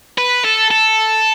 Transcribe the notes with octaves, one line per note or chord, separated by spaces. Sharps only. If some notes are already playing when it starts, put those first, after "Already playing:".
B4
A4
A4